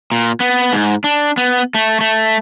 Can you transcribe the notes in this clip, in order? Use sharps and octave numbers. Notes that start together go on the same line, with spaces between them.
A#2
B3
G#2
D4
B3
A3
A3